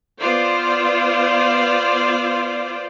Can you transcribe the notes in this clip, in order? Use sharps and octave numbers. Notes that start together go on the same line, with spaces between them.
B3 F4 C5 D5